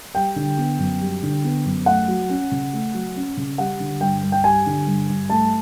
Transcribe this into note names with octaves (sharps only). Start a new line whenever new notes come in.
G3 G5
D3
B3
F#2
G3
D3
B3
F#2
A3 F#5
F#3
C#4
C#3
A3
F#3
C#4
C#3
G3 F#5
D3
G2 G5
G2
G5
G3 G#5
D3
G2
G2
A3 A5